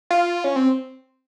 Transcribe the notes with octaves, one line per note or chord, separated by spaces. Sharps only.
F4
C#4
C4